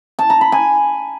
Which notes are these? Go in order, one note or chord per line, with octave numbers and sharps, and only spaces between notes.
A5
A#5
B5
G#5